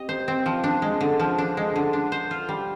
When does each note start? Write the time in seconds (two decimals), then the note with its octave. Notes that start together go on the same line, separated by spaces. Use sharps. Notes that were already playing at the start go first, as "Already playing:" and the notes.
Already playing: C4 G4 D#5
0.09 C5
0.28 C4
0.46 F3
0.64 D4
0.82 G#3
1.01 D3
1.19 F3
1.38 D4
1.57 G#3
1.76 D3
1.93 D4
2.12 C5
2.31 F4
2.49 G3